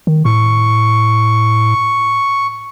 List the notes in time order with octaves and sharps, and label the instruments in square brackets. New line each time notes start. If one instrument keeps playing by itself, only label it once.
[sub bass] D#3
[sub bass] A2 [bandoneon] C#6